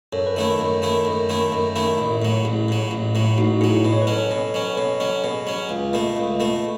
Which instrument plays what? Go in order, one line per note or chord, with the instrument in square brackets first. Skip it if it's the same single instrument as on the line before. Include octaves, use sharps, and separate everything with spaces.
[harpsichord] F#2 [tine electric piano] A4 C#5
[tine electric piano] B4
[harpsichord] D#3 A3 E4 [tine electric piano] A4 C#5
[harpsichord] F#2 [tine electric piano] A4 C#5
[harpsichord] D#3 A3 E4
F#2
D#3 A3 E4
F#2
D#3 A3 E4
A1
A2 F#3
[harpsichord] A1 [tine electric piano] E4 G#4
[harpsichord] A2 F#3
A1
A2 F#3
[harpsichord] A1 [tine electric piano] D#4 F#4
[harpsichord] A2 F#3 [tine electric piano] E4 G#4
[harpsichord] B2
[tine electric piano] C#5
B4
[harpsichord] F#3 C#4 [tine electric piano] A4 C#5
[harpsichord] B2
F#3 C#4
[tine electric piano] B4
[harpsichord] B2 [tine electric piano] A4 C#5
[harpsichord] F#3 C#4
[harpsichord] B2 [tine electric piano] G#4 B4
[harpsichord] F#3 C#4
C#2
B2 A3
C#2
B2 A3